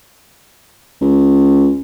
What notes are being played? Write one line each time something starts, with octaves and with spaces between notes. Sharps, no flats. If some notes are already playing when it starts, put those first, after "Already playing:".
C#2